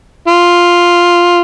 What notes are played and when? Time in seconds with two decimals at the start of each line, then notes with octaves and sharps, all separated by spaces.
0.28 F4